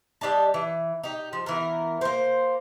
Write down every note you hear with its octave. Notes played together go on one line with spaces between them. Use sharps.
G3 D4 D#5 A5
E3
D#4 G4
F3
E3 B3 A#4
A#3 C5